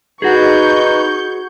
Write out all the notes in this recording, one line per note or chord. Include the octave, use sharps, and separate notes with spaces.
D#4 F#4 G#4 B4 F#5 C#6 G6 G#6